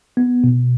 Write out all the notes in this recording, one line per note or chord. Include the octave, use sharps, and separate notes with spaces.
B3
B2